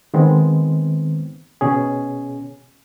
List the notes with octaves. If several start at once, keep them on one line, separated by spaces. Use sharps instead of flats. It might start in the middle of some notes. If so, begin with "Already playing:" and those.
D#3 G#3 B3 C4
B2 C#4 G#4